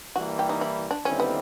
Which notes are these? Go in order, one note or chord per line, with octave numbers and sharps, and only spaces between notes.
E3 G3 A#3 F#4
G4
D#4
E4
D4
D#2 D3 G3 C4 C#4 E4
B3